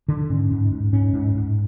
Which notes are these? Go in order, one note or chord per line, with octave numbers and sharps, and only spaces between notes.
D3
G#2 C#4
G#2
G#2
G#2 C#4
G#2
G#2